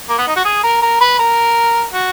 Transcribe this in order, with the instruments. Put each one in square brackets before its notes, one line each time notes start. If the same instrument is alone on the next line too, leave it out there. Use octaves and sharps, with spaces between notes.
[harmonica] A#3
B3
D#4
F#4
G#4
A#4
A#4
B4
A#4
F#4